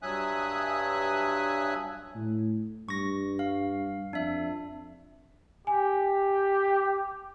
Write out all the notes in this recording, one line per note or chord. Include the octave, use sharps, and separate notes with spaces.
G2 F#3 E5 G#5 D#6 F#6
A2
G2 C#6 A#6
F5
F2 D4 E5
G4 G#5